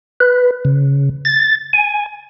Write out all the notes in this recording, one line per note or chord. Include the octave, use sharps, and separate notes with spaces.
B4
C#3
A6
G#5